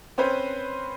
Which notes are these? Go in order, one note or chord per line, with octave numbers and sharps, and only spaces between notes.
C4 C#4 B4 C5